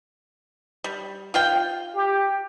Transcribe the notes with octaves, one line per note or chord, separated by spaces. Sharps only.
G3
F4 F5 G5
G4